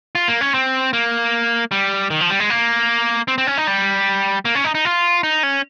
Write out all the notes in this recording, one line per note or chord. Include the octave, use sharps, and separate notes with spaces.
F4
A#3
C#4
C4
A#3
G3
D#3
F3
G3
G#3
A#3
C4
C4
C#4
D#4
G3
A#3
C#4
D#4
D#4
F4
D#4
C#4